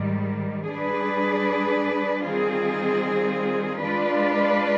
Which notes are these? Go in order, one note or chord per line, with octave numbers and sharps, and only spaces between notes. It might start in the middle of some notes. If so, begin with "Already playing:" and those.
Already playing: G#2 D#3 G3
G3 D4 G#4 B4 D5
D#3 G3 C4 F4 G#4
G#3 D4 F4 B4 D5